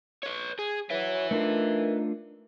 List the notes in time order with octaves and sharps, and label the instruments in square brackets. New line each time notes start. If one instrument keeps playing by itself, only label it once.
[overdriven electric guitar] B4 C#5
G#4
[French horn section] F#3 C#5 [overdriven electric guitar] B4 E5
[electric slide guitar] A3 D4 F4 [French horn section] D#4 A4 A#4